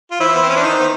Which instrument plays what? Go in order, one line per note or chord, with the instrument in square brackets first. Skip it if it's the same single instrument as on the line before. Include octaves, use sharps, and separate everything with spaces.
[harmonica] F4
[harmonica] E3 E4 [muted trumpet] C5
[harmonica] B3
C4
C#4
D4
D#3 D#4
B3